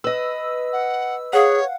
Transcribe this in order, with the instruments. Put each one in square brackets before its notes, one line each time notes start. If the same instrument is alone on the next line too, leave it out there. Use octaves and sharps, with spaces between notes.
[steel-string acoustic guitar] B4 D#5 [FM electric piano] E6
[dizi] F#5
[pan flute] G#4 [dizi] C#5 [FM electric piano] F5 F#5